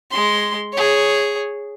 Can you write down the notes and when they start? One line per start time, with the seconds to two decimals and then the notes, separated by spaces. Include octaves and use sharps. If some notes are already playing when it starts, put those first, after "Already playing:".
0.11 G#3 C6
0.73 G#4 C#5